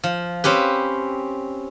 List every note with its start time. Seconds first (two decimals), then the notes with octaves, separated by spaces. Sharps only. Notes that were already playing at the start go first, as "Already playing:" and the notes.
0.04 F3
0.44 C4 C#4 G4 B4